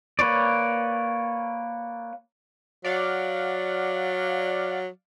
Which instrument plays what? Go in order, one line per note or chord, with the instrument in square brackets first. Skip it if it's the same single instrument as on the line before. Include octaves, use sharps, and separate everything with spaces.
[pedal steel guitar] A#3 B4 C#5 D5
[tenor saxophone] F#3 [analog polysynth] D5 F5 F#5